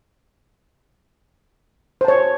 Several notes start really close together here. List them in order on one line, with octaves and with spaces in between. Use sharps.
C5 A5 C#5